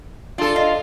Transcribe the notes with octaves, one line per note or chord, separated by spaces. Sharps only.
D4 F4 A4
D#5 F5